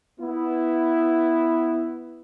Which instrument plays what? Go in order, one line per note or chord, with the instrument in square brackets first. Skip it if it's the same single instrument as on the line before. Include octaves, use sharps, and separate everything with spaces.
[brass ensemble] B3 E4